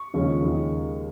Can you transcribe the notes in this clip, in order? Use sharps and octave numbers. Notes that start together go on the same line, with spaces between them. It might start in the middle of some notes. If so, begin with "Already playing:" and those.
Already playing: C#6
D#2 C#3 F3 G#3 C#4
D#2 D#3 G#3